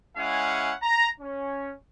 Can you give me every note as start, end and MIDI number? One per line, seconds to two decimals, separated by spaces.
0.17 0.72 56
0.17 0.72 61
0.17 0.72 64
0.17 0.72 77
0.17 0.72 78
0.17 0.72 80
0.82 1.07 82
1.20 1.72 61